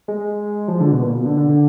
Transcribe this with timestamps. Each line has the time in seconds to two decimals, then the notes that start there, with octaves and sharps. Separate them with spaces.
0.08 G#3
0.68 F3
0.80 D3
0.92 B2
1.02 A#2
1.15 B2
1.26 D3
1.37 D3
1.49 D3